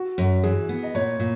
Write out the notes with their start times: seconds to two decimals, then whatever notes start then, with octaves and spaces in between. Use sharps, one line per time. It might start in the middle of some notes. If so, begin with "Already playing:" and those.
Already playing: F#4
0.18 F#2
0.43 E3 G#4
0.69 B3
0.83 D#5
0.95 A#2 C#5
1.20 A#2